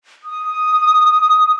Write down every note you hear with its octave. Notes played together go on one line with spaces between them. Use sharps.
D#6